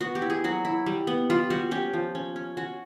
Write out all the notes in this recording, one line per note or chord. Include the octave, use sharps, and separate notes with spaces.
B3 F#4
G4
E4
G#4
F#3 F#4
E4
G3
B3
G3 F4
G3 F#4
C#4 G4
F3
C#4
C#4
C#4 F#4